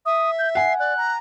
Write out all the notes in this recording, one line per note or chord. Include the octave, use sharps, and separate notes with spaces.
E5 D#6
G6
F#5 G#5 C7
D5 F#6
A#5